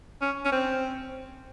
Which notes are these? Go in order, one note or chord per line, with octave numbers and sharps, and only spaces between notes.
C#4
C#4
C4